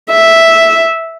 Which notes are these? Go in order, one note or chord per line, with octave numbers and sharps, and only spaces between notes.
E5